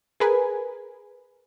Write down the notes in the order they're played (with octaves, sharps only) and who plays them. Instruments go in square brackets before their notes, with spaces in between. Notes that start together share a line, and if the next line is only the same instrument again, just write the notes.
[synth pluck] G#4 A#4 B4 G#5